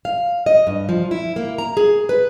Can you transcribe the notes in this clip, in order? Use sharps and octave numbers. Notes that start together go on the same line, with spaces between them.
F5
D#5
G2
F3
E4
A#3
A#5
G#4
B4